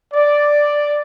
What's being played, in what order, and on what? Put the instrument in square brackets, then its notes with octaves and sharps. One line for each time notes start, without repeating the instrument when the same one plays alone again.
[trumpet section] D5